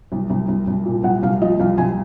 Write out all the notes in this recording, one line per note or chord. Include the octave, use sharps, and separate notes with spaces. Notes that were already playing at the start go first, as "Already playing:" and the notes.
C2
C2
C2
C2
A#2
C2 F#5
C2 F5
F3 D#5
C2 F5
C2 G#5